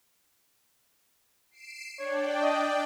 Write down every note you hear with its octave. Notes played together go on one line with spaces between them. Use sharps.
C7 D7 E7
D4 C#5 D5 G5
D#5